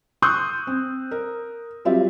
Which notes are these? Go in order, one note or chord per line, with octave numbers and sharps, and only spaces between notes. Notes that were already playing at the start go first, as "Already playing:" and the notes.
C6 C#6 D#6 E6 F#6 G6
C4
A#4
F#3 G3 C4 F4 G4 E5